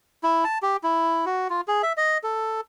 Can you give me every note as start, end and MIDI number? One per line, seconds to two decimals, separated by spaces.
0.23 0.44 64
0.44 0.58 81
0.62 0.77 67
0.83 1.25 64
1.26 1.48 66
1.50 1.61 65
1.68 1.82 68
1.83 1.93 76
1.97 2.18 75
2.23 2.61 69